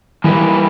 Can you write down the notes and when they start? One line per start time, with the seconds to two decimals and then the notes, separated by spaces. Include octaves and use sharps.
0.24 E3 G3 A#3 D#4 G4 B4